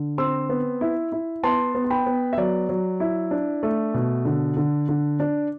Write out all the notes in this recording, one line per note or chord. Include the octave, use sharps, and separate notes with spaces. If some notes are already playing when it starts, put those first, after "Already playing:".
Already playing: D3
C4 C6 E6
B3
E4
E4
B3 A5 C6
B3
C6
G5 B5
B3
E5
F#3 D5
F#3
E4
D4
A3
B2
D3
D3
D3
D4